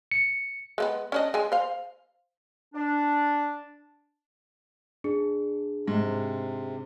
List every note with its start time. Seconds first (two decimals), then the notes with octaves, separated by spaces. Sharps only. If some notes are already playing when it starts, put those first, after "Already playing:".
0.11 C#7
0.78 G#3 A3 B3
1.12 C#4 D4 D#5
1.34 G#3 G#5
1.52 C5 F5
2.74 D4
5.04 D4 G#4
5.88 G#2 C3